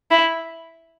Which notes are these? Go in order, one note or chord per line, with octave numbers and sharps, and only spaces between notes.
E4